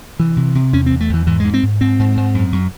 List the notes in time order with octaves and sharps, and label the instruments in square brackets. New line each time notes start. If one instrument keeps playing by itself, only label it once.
[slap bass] C3 E3
C3
C3
E2 C#4
C4
E2
A3
E2 E3
G#2 E3
G#3
G#2
C4
G#2
G#2 C4
G#2
G#2
F#2
F#2